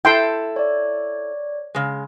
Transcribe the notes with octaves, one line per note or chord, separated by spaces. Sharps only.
E4 A4 G5 C6
C#5 D5
C#3 G#3